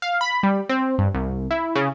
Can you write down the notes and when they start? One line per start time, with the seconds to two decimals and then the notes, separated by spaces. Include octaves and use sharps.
0.02 F5
0.21 B5
0.43 G3
0.69 C4
0.98 G2
1.14 C2
1.51 E4
1.75 C#3